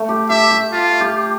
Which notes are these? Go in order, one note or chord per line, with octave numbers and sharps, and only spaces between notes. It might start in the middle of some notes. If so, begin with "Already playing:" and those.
Already playing: A3
G4
G4 E5
G4
F4
G4